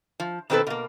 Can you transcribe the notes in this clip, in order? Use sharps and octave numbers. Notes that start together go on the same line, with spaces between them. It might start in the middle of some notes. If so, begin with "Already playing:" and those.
F3
B2 D#3 C4 G4 A4 B4
B2 A#3